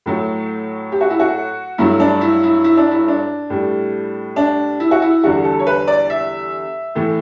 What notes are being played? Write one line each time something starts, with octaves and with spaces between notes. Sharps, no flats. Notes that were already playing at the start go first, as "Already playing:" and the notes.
A2 F#3 A3
G4
F#4
E4
F#4
G2 F#3 A3 E4
D4
E4
E4
E4
D4
E4
D4
A2 G3
D4
E4
F#4
E4
E2 D3 G3 F#4
A4
C#5
B4
D5
E5
A2 E3 A3